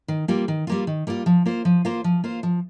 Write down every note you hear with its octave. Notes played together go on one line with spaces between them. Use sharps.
D#3
G3 A#3 F4
D#3
G3 A#3 F4
D#3
G3 A#3 F4
F3
A#3 F4 C5
F3
A#3 F4 C5
F3
A#3 F4 C5
F3